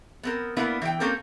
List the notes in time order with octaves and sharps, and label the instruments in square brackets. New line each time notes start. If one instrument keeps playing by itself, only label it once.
[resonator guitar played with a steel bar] B3 C4 A#4
A#3 B3 D4 E4 A#4 B4
E3 C5 G5
A#3 C4 C#4 G4 A4 A#4